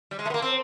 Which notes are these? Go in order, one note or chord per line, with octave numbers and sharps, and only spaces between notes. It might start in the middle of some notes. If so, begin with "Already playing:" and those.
G3
G#3
A3
B3
A#3
C4